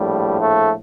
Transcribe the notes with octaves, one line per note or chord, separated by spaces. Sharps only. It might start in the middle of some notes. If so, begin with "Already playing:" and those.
Already playing: A#1 A2 F3 G3
A3